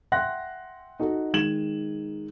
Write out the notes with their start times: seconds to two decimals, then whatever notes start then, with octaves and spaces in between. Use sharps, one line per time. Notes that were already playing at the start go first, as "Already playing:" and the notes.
0.12 E5 F#5 G5 C6 F#6 A#6
1.00 D#4 F#4 A4
1.33 D#3 G#3 G#6 E7 F#7